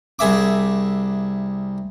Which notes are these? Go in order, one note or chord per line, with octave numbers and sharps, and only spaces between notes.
C2 G#4 E5 D6